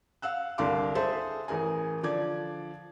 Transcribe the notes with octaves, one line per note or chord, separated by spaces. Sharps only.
F5 F#5 E6 F#6
C2 D3 A#4 F5 C6 D6
G#4 A4 C5 E5 A5 C6
A1 G#4 A#4 G#5
D3 F3 D5 D6 G#6